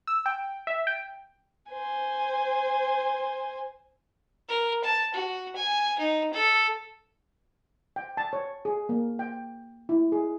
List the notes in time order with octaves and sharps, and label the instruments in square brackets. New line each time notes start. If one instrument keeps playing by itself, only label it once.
[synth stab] E6
G5
E5
G5
[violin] C5 G#5
[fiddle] A#4
A5
F#4
G#5
D#4
A4
[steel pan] G5
A5
C#5
G#4
A#3
G5
E4
G#4